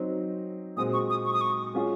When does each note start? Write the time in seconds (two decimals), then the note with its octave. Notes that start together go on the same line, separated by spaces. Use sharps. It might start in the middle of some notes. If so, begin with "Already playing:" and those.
Already playing: F#3 C4 D#4
0.77 A#2 G#3 C4 F#4 D#6
0.93 C#6
1.10 D#6
1.25 C#6
1.33 D#6
1.41 C#6
1.74 G#3 C#4 F4 G#4